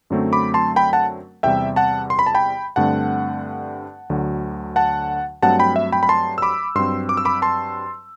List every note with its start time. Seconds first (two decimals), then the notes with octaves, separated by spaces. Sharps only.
0.10 F#2 D3 F#3 A3 C4
0.33 B5 D6
0.54 A5 C6
0.76 G5 B5
0.93 F#5 A5
1.43 E2 C3 G3 E5 G5
1.76 F#5 A5
2.10 C6
2.19 B5
2.26 A5
2.35 G5 B5
2.76 G2 D3 A3 C4 F#5 A5
4.10 D2 D3 F#3
4.76 F#5 A5
5.42 G2 F#3 A3 C4 F#5 A5
5.59 G5 B5
5.76 E5
5.92 G5 B5
6.03 B5
6.09 A5 C6
6.38 E6
6.42 B5 D6
6.75 G2 F#3 C4 C6 E6
7.09 D6
7.17 E6
7.25 B5 D6
7.42 A5 C6